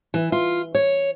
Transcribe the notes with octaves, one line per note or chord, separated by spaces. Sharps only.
E3
F4
C#5